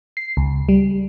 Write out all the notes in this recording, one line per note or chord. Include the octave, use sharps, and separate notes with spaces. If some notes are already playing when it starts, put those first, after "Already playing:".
C7
C#2
G3